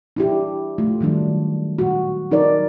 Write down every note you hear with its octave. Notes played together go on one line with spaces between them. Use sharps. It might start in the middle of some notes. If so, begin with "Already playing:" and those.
D4 E4 G4
A3 F4
D#3 F#3 G3 D4
A#2 F#4
F#3 D#4 A#4 D5